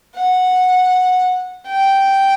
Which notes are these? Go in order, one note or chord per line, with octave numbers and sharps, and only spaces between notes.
F#5
G5